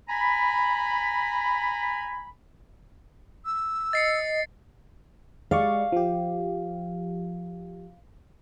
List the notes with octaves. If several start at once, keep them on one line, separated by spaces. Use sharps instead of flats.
G#5 A#5 B5
E6
D#5 A6 C7 C#7
G#3 D5 F5 C#6
F3 G4